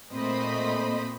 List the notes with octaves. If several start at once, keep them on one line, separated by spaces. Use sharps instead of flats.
A#2 A3 C4 C5 D#5 B5